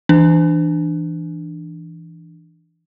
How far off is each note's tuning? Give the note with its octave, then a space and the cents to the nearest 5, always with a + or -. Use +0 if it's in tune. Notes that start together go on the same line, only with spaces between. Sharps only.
E3 +0 D4 +15